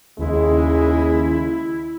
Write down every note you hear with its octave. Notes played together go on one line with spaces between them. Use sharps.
D#2 C#3 G#3 E4